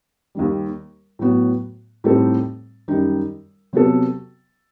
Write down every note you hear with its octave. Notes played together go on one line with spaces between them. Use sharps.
D#2 D#3 G3
A2 F#3 B3 F#4
A2 G3 C4 D#4 A4
F#2 D#3 G3 D#4
C3 F#3 B3 F#4 A4